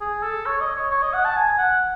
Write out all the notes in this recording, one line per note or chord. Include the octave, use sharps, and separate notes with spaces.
G#4
A4
C#5
D#5
C#5
C#5
D#5
F#5
A5
G#5
F#5